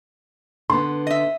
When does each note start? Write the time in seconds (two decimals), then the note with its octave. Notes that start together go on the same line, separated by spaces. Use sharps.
0.70 D3 B3 C6
1.07 D#5 E5